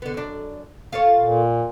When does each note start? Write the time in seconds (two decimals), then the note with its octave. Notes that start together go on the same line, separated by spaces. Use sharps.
0.02 D3 B3
0.14 F#2 D4
0.93 F4 A4 C#5
1.20 A#2